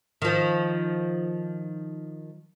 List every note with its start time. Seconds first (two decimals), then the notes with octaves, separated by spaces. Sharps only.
0.22 D#3 F3